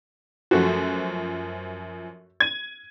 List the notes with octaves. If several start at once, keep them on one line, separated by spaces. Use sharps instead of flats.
F#2 F3 A3 F#4
G#6 D#7